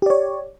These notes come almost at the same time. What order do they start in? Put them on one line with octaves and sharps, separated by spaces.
G4 D5 C#5